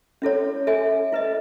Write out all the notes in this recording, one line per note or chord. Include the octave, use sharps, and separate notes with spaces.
C#4 E4 A4 C#5
A4 E5 G#5
E4 B4 D#5